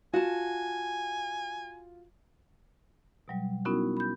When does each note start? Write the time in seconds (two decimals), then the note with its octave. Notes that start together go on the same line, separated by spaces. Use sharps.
0.14 F4 F#4 G#5 A5
3.28 B2 F#3 G3
3.65 B3 C#4 D#4 E4 F#4 A#4
3.97 B5 G6